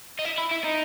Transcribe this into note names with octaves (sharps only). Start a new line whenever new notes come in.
D#4
E4
E4
E4
D#4